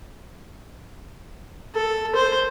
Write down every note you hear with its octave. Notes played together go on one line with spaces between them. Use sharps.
A4
C5